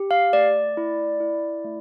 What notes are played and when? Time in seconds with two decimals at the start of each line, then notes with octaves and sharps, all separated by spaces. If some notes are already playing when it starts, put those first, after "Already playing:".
Already playing: G4
0.11 F5
0.33 A3 D5
0.77 E4
1.20 E4
1.65 A3